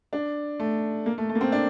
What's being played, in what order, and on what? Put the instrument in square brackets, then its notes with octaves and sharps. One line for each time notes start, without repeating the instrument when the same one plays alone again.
[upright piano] D4
A3
A#3
A3
A3
A#3
C4
D4